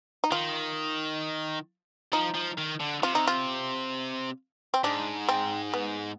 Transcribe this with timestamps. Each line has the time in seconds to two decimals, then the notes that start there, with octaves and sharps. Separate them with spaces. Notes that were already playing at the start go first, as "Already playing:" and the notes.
0.24 D#4
0.31 D#3 F4
2.13 F3 D#4
2.35 F3
2.58 D#3
2.80 D3
3.03 C3 F4
3.15 D#4
3.27 F4
4.74 C4
4.84 G#2 D4
5.29 C4
5.74 B3